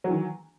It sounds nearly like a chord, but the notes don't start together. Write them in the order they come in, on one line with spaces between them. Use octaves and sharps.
F#3 E3 D#3